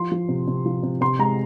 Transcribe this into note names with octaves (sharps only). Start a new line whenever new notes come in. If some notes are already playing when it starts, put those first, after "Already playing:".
Already playing: F3 C6
F3
C3
C3
F3
C3
C3 C6
G#3 A#5